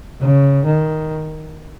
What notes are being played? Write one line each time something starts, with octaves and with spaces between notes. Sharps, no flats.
C#3
D#3